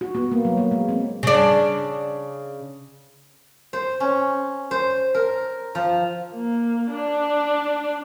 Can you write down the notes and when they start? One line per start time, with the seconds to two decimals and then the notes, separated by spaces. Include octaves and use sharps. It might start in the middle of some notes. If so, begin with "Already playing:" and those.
0.01 F#4
0.15 B3
0.32 A#3
0.45 F#3
0.57 A#3
0.71 G#3
0.89 C4
1.23 C#3 D4
3.73 C5
4.00 C#4
4.71 C5
5.14 A#4
5.75 F3
6.34 A#3
6.91 D4